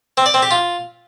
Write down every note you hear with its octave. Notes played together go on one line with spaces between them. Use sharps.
C4
D5
C4
G4
F4